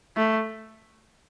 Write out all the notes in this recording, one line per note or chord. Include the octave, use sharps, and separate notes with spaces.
A3